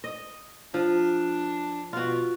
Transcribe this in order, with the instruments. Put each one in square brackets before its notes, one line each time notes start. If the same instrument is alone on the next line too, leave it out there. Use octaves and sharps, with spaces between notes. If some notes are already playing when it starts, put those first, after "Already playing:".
[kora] D#5
[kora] F3 [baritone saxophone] D4
[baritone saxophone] B2 [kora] F4 F#4